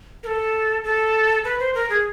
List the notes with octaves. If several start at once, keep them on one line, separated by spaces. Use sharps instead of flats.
A#4
A4
A4
B4
C5
A#4
G#4